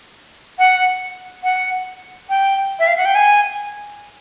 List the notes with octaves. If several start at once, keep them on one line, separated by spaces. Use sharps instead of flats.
F#5
F#5
G5
E5
F5
F#5
G5
G#5